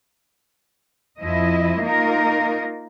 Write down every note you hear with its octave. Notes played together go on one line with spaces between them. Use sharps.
F2 F3 E4 D#5
A#3 D#4 F4 A#4